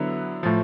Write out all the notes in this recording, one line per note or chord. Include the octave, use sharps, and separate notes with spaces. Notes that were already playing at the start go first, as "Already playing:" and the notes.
Already playing: D3 F#3 B3 E4
A2 F3